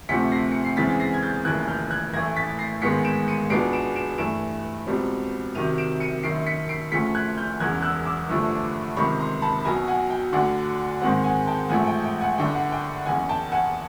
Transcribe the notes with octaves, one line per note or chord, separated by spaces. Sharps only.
D2 C3 F3 A3 C4 B6 C#7
A#6 C7
C#7
C7
E2 C#3 E3 G#3 C4 A6 B6
A#6 C7
G#6
G6 A6
F1 D#2 C#3 E3 F#6 G#6
F6 G6
F#6 G#6
A1 A2 E3 A3 G#6 A#6
A6 B6
A#6 C7
A1 G#2 D#3 G#3 B3 B6 C#7
D7 E7
C#7 D#7
C#2 B2 G#3 B3 D4 C7 D7
D7 E7
D7 E7
G2 E3 A3 D7 E7
C#2 B2 G3 C4
C2 C3 D#3 F#3 D#7 F7
D7 E7
C#7 D#7
F#1 F#2 D#3 C7 D7
B6 C#7
C7 D7
D2 C#3 F3 A3 B6 C#7
F#6 G#6
F6 G6
E1 E2 C#3 F#6 G#6
E6 F#6
D6 E6
G1 G2 D3 F3 A3
C#2 C3 D#3 B5 C#6
A#5 C6
A5 B5
B5
B1 B2 F#3 G#5 A#5
F#5 G#5
G5
D2 D3 F#3 F#5
G#2 D#3 G#3 C4 F#5
F#5 G#5
G5 A5
A1 G#2 F3 A3 F#5 G#5
G5
G5
F#5 G#5
G1 G2 D3 G5
F#5
G5
F#1 E2 C#3 F#5 G#5
G5 A5
F#5 G#5